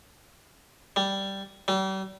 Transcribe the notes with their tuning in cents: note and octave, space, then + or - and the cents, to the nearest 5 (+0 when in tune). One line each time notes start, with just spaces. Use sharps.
G3 -5
G3 -40